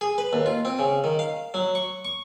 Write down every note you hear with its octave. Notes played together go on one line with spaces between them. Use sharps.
G#4
B4
D#2
F4
C4
C#3
D#3
F5
F#3
C#6
C#6